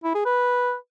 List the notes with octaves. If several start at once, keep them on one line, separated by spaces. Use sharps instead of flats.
E4
G#4
B4